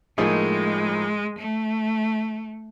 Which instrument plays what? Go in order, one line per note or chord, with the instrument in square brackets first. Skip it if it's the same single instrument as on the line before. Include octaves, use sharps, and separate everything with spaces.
[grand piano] A2 F3 A#3 D#4 G#4 [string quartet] G#3
[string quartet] A3